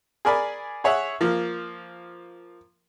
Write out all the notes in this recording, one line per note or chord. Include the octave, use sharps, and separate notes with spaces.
G#4 A#4 D5 G#5 B5
G#4 C#5 E5 F#5
F3 A#3